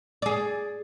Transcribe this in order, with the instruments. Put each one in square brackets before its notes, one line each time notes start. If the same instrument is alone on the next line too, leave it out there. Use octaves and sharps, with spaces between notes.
[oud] G#4 D5